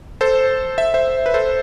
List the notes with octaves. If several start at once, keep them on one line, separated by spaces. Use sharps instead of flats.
A4 C5
E5
C5 E5
B4
A4 C5